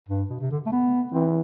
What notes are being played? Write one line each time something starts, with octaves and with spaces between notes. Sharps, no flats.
G2
B2
C3
D3
A3
B3
E3 C4